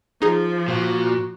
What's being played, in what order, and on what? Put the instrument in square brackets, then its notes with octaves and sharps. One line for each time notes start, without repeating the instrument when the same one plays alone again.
[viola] F3 [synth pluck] D#4 G#4
[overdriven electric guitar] A#2 [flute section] F#4